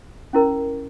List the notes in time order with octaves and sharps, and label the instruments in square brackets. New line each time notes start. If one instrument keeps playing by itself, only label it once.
[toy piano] C#4 E4 A#4